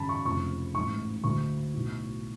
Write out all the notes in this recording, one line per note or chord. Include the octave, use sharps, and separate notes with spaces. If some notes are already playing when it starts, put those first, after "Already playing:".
Already playing: G#1 F#2 C#3 A5 B5
C#6
F1 F2 C#3 C#6
A1 G#2 C#6
D2 D3 C#6
B1 A2